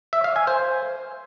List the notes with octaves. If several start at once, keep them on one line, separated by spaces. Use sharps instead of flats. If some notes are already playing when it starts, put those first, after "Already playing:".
E5
F5
G#5
C5